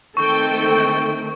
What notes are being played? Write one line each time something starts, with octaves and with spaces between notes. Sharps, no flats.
D#3 A3 C4 A4 G5 C#6